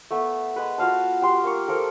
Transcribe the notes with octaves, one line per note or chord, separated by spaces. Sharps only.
A3 B3 E5
G#3 B4
F4 F#4 F5 A5
G4 C6
A#3 G5 C#6
F3 A4 A#4